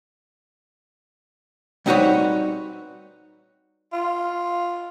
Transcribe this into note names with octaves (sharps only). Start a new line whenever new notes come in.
G3 C4 D#4 F#4 B4 C#5
F4